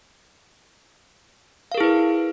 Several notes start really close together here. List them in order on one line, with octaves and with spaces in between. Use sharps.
F5 A#4 G#4 E4 B4